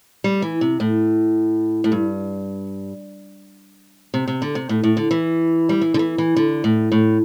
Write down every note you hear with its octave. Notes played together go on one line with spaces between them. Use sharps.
G3
E3
C3
A2
A2
G2
C3
C3
D3
C3
A2
A2
D3
E3
G3
E3
D3
E3
E3
D3
A2
A2